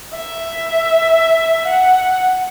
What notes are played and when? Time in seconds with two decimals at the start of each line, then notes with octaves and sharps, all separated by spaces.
0.16 E5
1.68 F#5